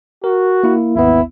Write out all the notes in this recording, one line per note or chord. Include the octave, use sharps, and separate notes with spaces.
F#4 A#4
A#3 E4
G#1 D#2 B3 E4